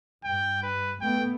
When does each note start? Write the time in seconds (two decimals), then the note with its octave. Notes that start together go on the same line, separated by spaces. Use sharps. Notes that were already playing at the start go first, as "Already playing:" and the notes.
0.24 G2 G5
0.63 B4
1.01 A3 B3 G5